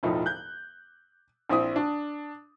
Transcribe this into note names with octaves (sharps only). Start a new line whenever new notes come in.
E1 A2 F3 D#4
F#6 G6
A#1 C4 E4 D#6
D4